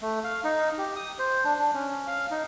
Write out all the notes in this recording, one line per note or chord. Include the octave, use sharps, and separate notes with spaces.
A3
F5
D#4
G4
D#6
C5
D4
D4
C#4
F5
D#4